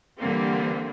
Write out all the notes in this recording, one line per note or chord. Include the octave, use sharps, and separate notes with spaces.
D3 E3 G3 A#3 C4